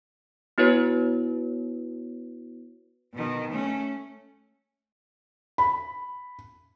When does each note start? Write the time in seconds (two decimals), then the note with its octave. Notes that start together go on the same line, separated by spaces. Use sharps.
0.58 B3 E4 F#4 B4 C#5
3.13 B2 D#3
3.51 A3 C#4
5.58 B5